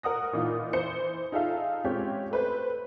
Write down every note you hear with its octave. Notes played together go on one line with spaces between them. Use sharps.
A#4 F#5 D#6 A#6
A#2 E3 D#4 F4
E3 C5 C#7
D#4 F4 G#4 A4 E5 F5
G#3 C4 C#4 F4 G4 C#5
A3 B4 C5